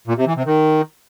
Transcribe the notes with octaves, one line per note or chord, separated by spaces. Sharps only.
A#2
C3
E3
C3
D#3